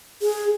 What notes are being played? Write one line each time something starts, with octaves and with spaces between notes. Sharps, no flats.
G#4